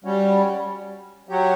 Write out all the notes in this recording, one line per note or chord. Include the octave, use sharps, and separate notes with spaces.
G3 C#4 F#4 C#5
F#3 G4 C#5 F#5